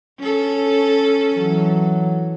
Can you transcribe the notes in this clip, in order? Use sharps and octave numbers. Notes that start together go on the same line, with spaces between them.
C#4 A4
E3 F#3